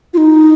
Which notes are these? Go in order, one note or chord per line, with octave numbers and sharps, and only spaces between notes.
F4
D#4